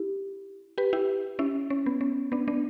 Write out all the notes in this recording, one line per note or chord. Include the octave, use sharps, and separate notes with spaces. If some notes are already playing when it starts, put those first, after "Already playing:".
Already playing: E4 G4
G4 B4
E4 G4
C#4 E4
C#4
B3
C#4
B3 D4
B3 D4